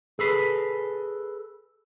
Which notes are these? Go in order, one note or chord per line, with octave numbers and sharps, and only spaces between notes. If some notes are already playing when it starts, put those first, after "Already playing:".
G#4 A4 B4